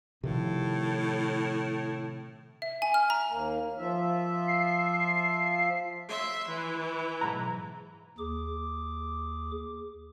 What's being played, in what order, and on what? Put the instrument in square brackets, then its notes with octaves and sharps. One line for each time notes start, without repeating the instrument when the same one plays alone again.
[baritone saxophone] A2 [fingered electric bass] C3 D#3 F3
[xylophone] E5
G#5
F6
A#5
[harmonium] D#2 A#3
F3 F4 E5
[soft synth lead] C7
[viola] E5 C6
E3
[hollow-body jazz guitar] B1 G#2 A#5
[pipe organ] D#2 G#4 D6